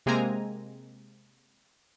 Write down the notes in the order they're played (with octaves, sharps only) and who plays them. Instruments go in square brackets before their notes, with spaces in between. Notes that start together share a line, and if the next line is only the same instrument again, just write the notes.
[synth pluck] C3 G#3 A#3 C4 G#5 A#5